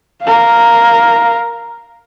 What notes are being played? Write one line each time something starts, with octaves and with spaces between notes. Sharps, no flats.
A#4 F5